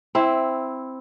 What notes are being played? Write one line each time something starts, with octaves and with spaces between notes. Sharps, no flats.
C4 E4